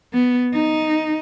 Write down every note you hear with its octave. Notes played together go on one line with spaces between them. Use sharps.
B3
D#4